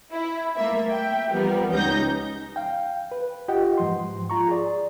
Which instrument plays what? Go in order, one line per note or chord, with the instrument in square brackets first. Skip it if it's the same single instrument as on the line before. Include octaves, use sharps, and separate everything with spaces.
[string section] E4
A3 A#3 E5
E5 G5
F3 G3 B3 A#4
C#2 C#4 D#4 G4 G6 A#6
[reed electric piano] F5 G5
B4
F4 G4 D#5 F#5 G5
G#2 F3 C6
F4 A#5 C#6
G#4 D5